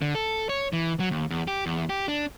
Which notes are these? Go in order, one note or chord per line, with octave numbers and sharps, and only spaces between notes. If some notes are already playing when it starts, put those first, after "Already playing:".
D3
A4
C#5
E3
F#3
D#2
E2
G4
E2
G4
D4